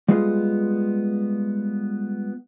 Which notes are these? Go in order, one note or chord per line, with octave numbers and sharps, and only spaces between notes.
G3 G#3 B3 F4 G#4